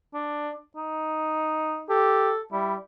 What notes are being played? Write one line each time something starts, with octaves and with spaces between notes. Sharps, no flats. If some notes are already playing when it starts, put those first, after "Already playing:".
D4
D#4
G4 A4
G3 E4